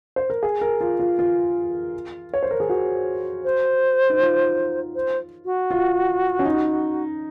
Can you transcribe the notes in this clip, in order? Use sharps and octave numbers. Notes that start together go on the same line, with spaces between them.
C5
A#4
G#4
A#4
F4
F4
F4
C#5
C5
A#4
G#4
F#4
C5
D#4
F4
C5
F#4
F4
C#4
D#4